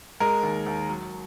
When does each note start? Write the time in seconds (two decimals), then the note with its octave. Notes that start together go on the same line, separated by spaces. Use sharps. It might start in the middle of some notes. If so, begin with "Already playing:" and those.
0.20 G#3 A#4
0.43 D#2
0.66 D#2
0.89 F#3